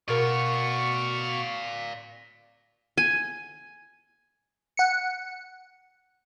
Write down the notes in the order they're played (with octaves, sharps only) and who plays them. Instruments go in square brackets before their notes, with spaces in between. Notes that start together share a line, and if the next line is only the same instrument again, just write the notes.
[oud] B2 A#4 [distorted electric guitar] D5 F5 [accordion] C#6
[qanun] G#5
[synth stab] F#5 C#7